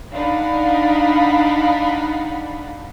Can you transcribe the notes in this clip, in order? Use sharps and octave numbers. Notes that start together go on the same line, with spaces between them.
D4 D#4 F5 F#5 B5